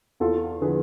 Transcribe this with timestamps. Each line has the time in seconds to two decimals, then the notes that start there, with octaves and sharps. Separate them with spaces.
0.20 E2 F4 A4
0.61 D3 F3 G#4 B4